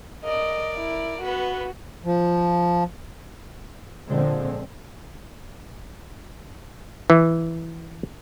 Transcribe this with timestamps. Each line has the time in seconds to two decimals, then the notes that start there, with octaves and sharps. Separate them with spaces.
0.24 A#4 D5 D#5
0.76 E4
1.22 B3 F#4 B4
2.05 F3
4.09 A#2 D3 F3 G#3 C4
7.10 E3